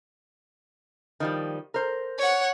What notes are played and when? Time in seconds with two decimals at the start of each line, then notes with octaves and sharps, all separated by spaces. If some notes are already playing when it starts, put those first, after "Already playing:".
1.20 D#3 F3 G3
1.74 A#4 C5
2.19 C#5 F#5